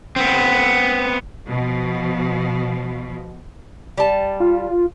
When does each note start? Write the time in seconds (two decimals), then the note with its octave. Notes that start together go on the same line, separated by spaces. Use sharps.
0.16 B3 C4
1.49 B2 F3
3.98 G3 A5
4.40 F4